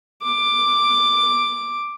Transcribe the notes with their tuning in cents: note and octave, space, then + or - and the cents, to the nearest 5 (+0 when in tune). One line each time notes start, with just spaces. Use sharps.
D6 +5